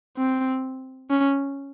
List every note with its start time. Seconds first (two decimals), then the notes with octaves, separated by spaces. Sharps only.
0.18 C4
1.11 C#4